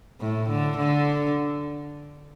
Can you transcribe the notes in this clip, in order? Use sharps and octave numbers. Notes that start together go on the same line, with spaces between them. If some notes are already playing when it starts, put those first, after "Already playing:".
A2
D3
D3